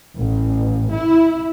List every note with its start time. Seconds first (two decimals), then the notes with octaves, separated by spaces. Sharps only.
0.18 A1
0.94 E4